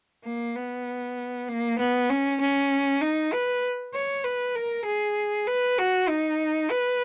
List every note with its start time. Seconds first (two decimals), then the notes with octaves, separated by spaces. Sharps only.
0.25 A#3
0.56 B3
1.49 A#3
1.79 B3
2.10 C#4
2.41 C#4
3.01 D#4
3.33 B4
3.94 C#5
4.24 B4
4.55 A#4
4.86 G#4
5.47 B4
5.79 F#4
6.09 D#4
6.71 B4